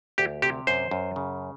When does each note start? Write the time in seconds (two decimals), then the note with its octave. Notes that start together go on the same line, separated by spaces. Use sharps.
0.18 D2 G4
0.42 C3 G4
0.67 F#2 C5
0.91 F#2
1.16 C#3